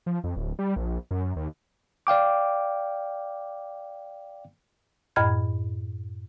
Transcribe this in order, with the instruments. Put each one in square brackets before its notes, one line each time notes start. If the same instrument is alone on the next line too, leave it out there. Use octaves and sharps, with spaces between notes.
[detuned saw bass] F3
F2
D1
G3
A#1
F#2
D#2
[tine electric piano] D5 F5 G5 D6
[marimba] F#2 A2 D#5 B5 F6 G#6